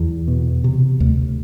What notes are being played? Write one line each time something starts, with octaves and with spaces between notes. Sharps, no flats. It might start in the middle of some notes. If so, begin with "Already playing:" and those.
Already playing: E2
B2
C3
D2